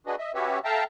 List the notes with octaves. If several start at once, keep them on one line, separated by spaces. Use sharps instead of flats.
D4 F#4 G#4 B4 D#5
D#5 E5
C#4 F#4 G4 B4 C#5 E5
A4 E5 F5 G5 A5 A#5